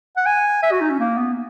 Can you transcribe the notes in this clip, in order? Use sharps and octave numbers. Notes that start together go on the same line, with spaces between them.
F#5
G#5
E5
F#4
D#4
C#4
A#3
B3